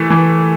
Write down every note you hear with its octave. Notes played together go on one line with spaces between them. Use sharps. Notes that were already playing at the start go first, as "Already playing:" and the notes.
Already playing: E3 A3
E3